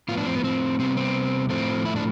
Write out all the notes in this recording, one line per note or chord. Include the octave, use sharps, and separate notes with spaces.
A2 F3 B3 F4
D4
C4
B3
C4
C3 G3 B3 C4
C4
A2 F3 A3 C4
E4
D4